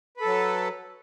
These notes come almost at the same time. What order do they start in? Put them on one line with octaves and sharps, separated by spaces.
B4 A4 F#3